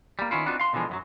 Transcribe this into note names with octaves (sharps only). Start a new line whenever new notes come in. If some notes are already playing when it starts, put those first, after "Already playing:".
G3 A#3
D#3 B3 C#4 E4 F4
B3 C4 D4 D#4 F4 F#4
F5 C6
B2 D3 E3 F3 G#3
F#2 D#3 F#3